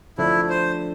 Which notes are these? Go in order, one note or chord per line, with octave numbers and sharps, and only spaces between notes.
D3 F3 A3 D4 E4
C5